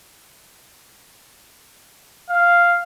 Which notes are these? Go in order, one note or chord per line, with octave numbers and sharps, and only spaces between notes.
F5